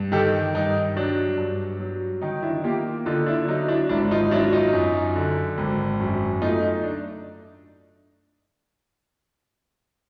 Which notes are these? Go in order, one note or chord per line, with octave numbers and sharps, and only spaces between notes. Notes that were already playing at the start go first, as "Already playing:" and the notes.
Already playing: G2
D#3 G4 A4
G2 D#4
F#3 D4
G2
F#3
D#3 D#4
D4 E4
A#3 F4 G4
D3 D#4 F4
D4 E4
F#3 D#4
D4 E4
G#1 D4 E4
D#4 F4
F#3 D4 E4
D#4 F4
F#2
D3
G#1
F#2
A3 D#4 F4
D#4
D4